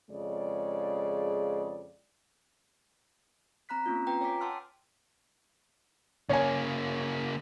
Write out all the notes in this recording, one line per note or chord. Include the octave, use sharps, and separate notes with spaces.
F2 C#3 G#3 D5
C4 A#5 B5 F#6 B6
A#3 C4 C#4 F4
F4 B4 G5 A#5
C#5 G5 G#5 D6 B6
F#5 G5 A5 C6 E6 F6
C#3 A#3 C#5 G#5